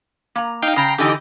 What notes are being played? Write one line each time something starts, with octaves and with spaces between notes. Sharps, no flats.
A#3 A#5
D#4 F5 G5
C#3 G5 A#5 C7
D3 E3 D#4 G4 D#5